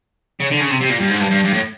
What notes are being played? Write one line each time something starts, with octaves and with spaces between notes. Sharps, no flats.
C#3
D3
C#3
C3
C3
A#2
G2
G#2
G2
G2
G2
A2